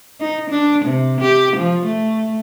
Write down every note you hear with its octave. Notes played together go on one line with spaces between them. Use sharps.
D#4
D4
C3
G4
F3
A3